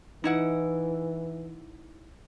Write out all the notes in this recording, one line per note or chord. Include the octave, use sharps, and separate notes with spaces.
E3 D#4 E4 F#5